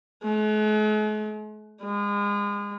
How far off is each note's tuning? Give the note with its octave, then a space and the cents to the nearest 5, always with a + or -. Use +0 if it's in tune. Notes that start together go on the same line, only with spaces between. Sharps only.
G#3 +45
G#3 -30